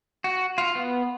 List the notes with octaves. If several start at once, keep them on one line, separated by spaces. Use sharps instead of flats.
F#4
F4
B3